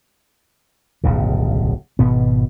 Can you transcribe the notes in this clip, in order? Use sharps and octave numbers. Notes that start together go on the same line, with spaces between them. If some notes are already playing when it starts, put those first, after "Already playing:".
D1 B1 G2 C#3
G#1 B2 B3